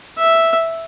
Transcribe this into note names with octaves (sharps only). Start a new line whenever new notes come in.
E5